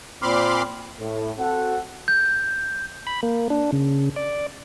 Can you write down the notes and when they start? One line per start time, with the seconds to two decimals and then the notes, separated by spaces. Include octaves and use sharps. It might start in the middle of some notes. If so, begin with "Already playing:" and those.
0.22 A#2 C4 B5 C6 D6 F6
1.00 A2
1.38 C4 F#4 A4 F#5
2.08 G6
3.07 B5
3.23 A#3
3.50 D4
3.72 C#3
4.16 D5